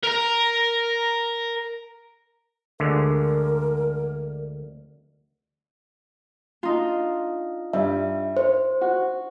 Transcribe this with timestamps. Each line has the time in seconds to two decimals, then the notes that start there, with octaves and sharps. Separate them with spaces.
0.03 A#4 A#5
2.80 D2 D3 G#3 A#4
6.63 D4 D#4 F4
7.73 G2 G3 E5
8.37 C5
8.81 F#4